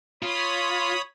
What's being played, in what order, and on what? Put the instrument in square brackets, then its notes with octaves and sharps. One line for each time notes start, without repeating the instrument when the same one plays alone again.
[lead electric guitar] F4 [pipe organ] C#5 B5 D#6